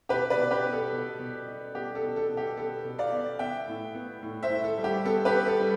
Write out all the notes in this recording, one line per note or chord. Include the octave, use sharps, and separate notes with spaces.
B2 G4 B4
B4 D5
B2
G4 B4
B3
A4
B2
B2
B2
B3 G4
A4
B2
A4
B2
G4
B3 A4
B2
D5 F5
B3
B3 E5 G5
A2
B3
A2
C5 E5
A2
A4
G3
G4
B3 A4
G4 B4
B3
A4
G3